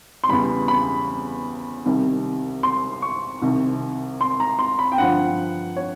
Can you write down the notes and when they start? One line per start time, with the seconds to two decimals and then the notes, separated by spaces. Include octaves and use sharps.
0.24 C6
0.29 E2 C#3 E3 G3 B5
0.68 B5
1.85 C2 C3 D#3 G3
2.63 C6
3.02 C#6
3.42 C2 C3 D#3
4.21 C6
4.40 A#5
4.59 C6
4.79 B5
4.92 G5
4.98 G2 D3 F3 F#5
5.76 C#5